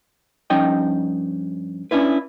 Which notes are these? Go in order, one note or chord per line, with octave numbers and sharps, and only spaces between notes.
G2 F3 C#4 D#4 D#5 G5
C#4 D4 E4 B4